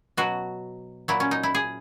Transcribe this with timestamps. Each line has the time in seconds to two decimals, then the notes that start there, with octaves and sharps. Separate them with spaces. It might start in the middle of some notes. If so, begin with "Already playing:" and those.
0.17 B2 F#3 F#4
1.08 A#2 F#3 E4
1.20 C#4
1.31 D#4
1.43 E4
1.55 G#4